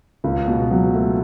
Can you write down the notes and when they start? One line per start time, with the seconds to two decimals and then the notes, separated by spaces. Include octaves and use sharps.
0.24 C#2
0.48 B2
0.71 F#3
0.94 A3